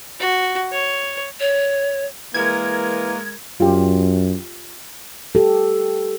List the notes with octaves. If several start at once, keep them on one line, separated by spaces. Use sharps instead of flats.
F#4
C#5
C#5
E3 G#3 A#3 A#4 G#6
F#2 F4 G4
G4 A4